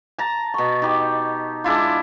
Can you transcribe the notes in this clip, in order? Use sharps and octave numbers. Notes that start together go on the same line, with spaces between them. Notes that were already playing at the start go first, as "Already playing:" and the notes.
A5 A#5
B2 C#6
D#4 G4
G#3 D4 E4 F4